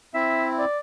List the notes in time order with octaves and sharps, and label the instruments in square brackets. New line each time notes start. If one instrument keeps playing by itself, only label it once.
[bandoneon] C4 E4 [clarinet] E5
[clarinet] D5